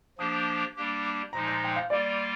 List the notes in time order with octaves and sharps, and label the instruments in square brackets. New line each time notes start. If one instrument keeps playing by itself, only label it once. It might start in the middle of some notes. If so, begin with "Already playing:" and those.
[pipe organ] F3 A#3 D4 G4 [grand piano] D#6
[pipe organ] G3 A#3 D4 G4
[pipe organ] A#2 F3 G#3 D#4 [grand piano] A#5
[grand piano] A#5
G5
F5
[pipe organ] G3 A#3 F4 [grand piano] D5